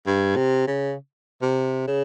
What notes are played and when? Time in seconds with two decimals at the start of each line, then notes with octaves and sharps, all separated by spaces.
0.06 G2
0.36 C3
0.67 C#3
1.42 C3
1.87 C#3